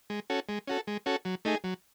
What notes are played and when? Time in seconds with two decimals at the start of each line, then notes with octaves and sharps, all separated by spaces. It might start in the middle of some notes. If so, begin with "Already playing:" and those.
0.10 G#3
0.30 C#4 F#4 A4
0.49 G#3
0.67 C#4 F#4 A4
0.87 G#3
1.06 C#4 F#4 A4
1.25 F#3
1.45 A3 D#4 G#4
1.64 F#3